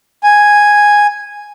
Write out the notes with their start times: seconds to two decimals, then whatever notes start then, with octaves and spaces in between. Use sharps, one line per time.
0.23 G#5